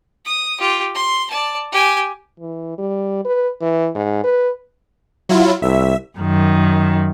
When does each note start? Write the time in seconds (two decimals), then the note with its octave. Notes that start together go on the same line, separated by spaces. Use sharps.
0.25 D#6
0.60 F4 G4
0.95 C6
1.30 D5 A5
1.72 G4 G#5
2.40 E3
2.78 G3
3.25 B4
3.61 E3
3.95 G#2
4.24 B4
5.29 F#3 E4 F4
5.62 C2 E5
6.18 F#2 D#3